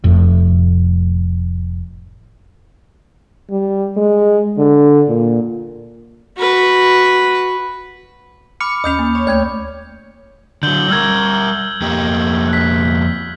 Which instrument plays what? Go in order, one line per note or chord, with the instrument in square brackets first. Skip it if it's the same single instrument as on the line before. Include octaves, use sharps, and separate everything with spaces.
[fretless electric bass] F1 F2 A2
[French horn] G3
G#3
D3
A#2
[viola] F#4 B4
[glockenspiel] B5 D6 F6 [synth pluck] C#7
[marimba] D#2 C#4 [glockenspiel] D#6 G6 F7
[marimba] A#3
[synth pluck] C#5
[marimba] D2 A3 G#6 [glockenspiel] G6
[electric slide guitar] D3 F#3 [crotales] G6 F#7 G7
[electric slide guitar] G3 A#4 [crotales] E6 F6 G#6
[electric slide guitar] F2 A#3 G4
[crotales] F#6 B6